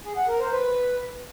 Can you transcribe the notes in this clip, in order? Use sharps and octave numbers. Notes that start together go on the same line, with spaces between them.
G#4
F#5
A#4
C5
B4